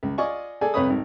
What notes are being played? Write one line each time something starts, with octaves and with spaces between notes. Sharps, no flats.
C#2
F4 D5 D#5 G#5 C#6
G#4 A4 D5 G#5
C2 F2 B4 C#5 B5 D#6
G#1